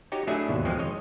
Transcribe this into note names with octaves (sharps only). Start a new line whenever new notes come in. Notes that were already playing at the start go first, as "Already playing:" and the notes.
D#4 F#4 G4 C#5
F#3 A3 D4 E4 G#4 E5
D#2 G#2 B2
F2 B2 E3 F3 G#3 C4
C#5 D#5